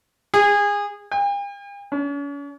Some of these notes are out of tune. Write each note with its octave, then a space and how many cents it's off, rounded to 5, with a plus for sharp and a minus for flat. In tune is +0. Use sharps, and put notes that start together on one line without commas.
G#4 -25
G5 +45
C#4 +40